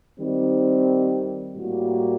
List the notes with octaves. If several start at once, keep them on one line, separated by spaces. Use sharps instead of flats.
D#3 G3 C4
A2 G3 A#3 F#4